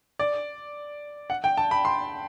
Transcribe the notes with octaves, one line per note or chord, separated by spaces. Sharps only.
D5
F#5
G5
A5
B5
C6